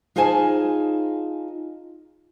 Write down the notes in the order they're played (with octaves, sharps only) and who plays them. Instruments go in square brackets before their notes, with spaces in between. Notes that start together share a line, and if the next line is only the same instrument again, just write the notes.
[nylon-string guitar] D#4 F4 G#4 C5 G#5 A5